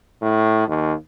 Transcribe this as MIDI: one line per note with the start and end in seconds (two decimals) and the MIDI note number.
0.22 0.67 45
0.68 0.93 39